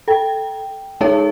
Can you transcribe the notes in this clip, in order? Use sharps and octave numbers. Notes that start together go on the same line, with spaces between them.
A4 G5
G#3 D#4 G#4 C#5